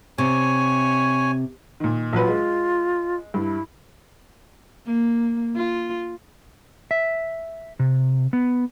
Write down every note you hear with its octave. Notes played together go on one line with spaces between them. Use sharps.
C3 C#5 G#5
A#2 D#3
A#1 F#3 F4 B4
G#3
G2 E4
A#3
F4
E5
C3
B3